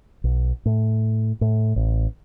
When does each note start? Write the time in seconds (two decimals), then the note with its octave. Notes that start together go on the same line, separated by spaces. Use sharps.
0.24 B1
0.66 A2
1.41 A2
1.76 A1